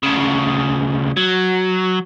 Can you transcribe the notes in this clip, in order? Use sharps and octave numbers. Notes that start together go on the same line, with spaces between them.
D2 C#3
F#3